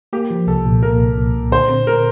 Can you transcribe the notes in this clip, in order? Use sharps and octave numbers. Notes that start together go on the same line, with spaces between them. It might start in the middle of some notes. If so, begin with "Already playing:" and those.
A#3 G4
F3
C2 A4
A#2
A#3 A#4
C2
A#2
A#2
D3 C5
C4
A#4